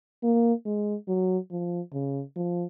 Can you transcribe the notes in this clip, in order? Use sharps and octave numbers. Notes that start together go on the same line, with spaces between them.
A#3
G#3
F#3
F3
C#3
F3